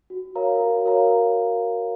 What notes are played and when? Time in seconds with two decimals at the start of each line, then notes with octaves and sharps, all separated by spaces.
0.10 F#4
0.35 A#4 C#5 F5 A#5
0.60 F#4
0.86 A#4 C#5 F5 A#5